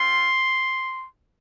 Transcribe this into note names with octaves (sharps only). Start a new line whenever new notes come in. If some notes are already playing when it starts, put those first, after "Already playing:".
Already playing: C4 F4 C6